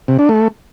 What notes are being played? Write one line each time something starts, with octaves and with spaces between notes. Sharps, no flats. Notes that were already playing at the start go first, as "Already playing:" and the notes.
C3
D4
A3